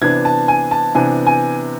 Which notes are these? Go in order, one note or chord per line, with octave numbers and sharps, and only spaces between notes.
C3 E3 B3 D4 G#6
A5
G#5
A5
C3 E3 B3 D4 G#5
G#5